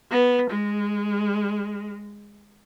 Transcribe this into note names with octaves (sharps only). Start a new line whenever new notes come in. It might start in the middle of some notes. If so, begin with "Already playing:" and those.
B3
G#3